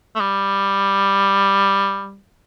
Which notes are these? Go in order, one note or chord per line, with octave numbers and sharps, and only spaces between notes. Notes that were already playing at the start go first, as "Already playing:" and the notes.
A3
G3